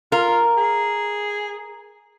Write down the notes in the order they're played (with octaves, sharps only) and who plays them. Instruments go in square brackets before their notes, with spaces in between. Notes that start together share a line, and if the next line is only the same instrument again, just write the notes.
[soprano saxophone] F4 [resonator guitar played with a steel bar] A#4
[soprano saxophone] G#4